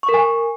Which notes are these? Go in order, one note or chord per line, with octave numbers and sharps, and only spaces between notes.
C#6
A#4
G#5